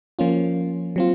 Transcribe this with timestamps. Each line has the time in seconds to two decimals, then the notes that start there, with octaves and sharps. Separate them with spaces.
0.19 F3 A#3 C#4 F4
0.96 F#3 C4 F4